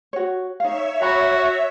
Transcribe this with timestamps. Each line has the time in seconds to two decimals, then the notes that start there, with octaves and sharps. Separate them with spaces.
0.13 F#4 C#5
0.60 D#4 C#5 E5 F5
1.02 F#4 A#5 B5